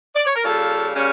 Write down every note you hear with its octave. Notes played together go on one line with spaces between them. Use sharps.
D5
C#5
A#4
C#3 G3 A#3 C#4 F4 A4
C#3 G3 A#3 C#4